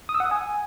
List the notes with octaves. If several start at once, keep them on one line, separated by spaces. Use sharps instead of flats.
D#6
E6
F#5
D#6
G#5